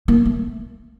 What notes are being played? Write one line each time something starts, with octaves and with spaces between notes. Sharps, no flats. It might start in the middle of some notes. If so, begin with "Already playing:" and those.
A#3
A3